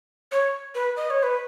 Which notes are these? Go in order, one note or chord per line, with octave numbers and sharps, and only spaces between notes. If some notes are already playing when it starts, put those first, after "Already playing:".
C#5
B4
D#5
C#5
B4